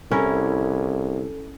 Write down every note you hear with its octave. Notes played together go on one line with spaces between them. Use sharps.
C2 C#4 E4 A4 A#4